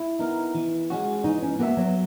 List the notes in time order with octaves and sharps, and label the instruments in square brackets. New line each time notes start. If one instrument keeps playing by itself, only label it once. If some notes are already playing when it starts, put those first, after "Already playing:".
Already playing: [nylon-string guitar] E4
[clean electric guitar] B3 D#4 A#4
E3
G#3 C#4 F#4
[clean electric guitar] E3 [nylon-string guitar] D#4
[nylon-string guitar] C#4
[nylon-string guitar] A#3 [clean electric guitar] B3 F#4 A#4 E5
[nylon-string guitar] F#3